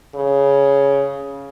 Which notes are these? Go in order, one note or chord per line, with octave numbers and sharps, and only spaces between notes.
C#3